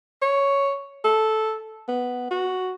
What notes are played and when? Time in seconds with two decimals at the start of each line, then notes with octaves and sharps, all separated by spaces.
0.22 C#5
1.05 A4
1.89 B3
2.31 F#4